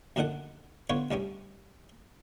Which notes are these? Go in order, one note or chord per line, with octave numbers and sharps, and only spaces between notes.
F#2 A#2 D3 D#3 A4 F#5
D3 B3 F4 C5 C#5
C2 G2 C#4 G4